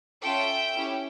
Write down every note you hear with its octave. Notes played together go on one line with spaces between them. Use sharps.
C#4 F4 A4 E5 G5
C#4 E4 G4